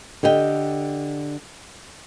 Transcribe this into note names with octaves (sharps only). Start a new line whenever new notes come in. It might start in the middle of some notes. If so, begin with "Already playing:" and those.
D3 G4 D#5 G5